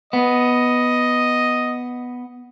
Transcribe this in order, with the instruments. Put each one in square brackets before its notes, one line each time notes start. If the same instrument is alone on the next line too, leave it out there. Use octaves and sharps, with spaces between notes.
[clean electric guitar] B3 [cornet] D#5